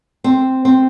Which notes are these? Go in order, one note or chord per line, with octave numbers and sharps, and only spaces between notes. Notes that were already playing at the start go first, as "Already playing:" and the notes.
C4
C4